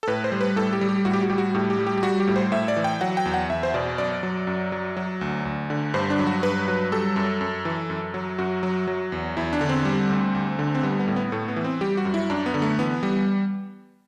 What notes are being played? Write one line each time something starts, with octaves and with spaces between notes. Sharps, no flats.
A4
A2 B4
C5
G3
B4
A2 A4
G4
G3
G4
A2 F#4
G4
F#4
G3 G4
F#4
A2 G4
G4
G3
G4
G4
G3 F#4
G4
A2
C5
A2 E5
D5
E3
G5
F#3 F#5
G5
E2
F#5
E2 E5
C5
B2 D5
F#2 D5
F#3
F#2
F#3
F#3
D2
D2
D3
G2 C5
D4
F#3
F#4
G2 B4
F#3
G3 A4
F#2
F#2
E3
F#2
F#3
F#2 F#4
F#3
F#3
E2
E2 E4
D4
D3
C4
G3
D2
D2
D3
C4
G3 B3
B3
A2
B3
A2 A3
B3
E3
C4
G3 G4
F#4
F#2
E4
F#2 D4
B3
D3
A3
E3 B3
G3